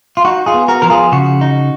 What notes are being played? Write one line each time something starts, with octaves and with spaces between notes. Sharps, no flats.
F4
D#4 F#4
F4 G#4
B3
F#4 A#4
F3 A#4
F4 G#4
C#3 F#4
D#4